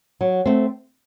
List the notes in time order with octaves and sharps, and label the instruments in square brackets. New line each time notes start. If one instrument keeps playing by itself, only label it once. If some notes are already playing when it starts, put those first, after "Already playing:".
[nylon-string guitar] F#3
A3 C4